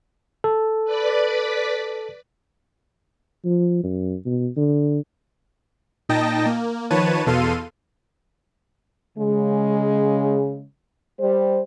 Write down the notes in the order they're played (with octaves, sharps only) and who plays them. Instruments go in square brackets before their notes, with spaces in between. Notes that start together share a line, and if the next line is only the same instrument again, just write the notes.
[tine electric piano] A4
[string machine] B4 D5 B5
[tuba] F3
F#2
B2
D3
[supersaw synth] A#2 D#4 D#5 G5 A5 A#6
A#3
D#3 F3 B4 C#5 A5 D#7
E2 B2 A4 F5 C6 D#7
[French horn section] C#3 G#3
G3 C5